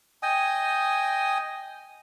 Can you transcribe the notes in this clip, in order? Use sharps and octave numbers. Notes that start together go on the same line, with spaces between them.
D#5 G5 G#5 D#6